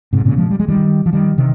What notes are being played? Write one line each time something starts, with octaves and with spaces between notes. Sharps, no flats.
G#2 C3
A#2 C#3
F3 G#3
G3
G#3
D#3 G3
F3
D#3 G3
C3 D#3